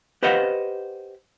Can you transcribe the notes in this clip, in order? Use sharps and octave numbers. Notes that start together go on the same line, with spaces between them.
G4 B4 C5 D#5 F5 F#5